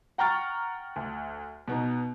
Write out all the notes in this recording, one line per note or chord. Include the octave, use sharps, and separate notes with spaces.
F#5 G5 A#5 C#6 F6 A6
D2
B2 B3 D#4